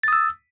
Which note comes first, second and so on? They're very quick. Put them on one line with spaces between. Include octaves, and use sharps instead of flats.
A6 D#6 E6